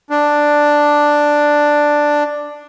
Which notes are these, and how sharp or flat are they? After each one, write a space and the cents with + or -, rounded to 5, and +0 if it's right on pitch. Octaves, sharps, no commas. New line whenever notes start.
D4 +5